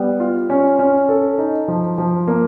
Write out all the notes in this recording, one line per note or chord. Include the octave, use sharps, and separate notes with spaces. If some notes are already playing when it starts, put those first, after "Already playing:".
Already playing: G3 B3
F4
C#4
C#4
A4
D#4
F3
F3
A#3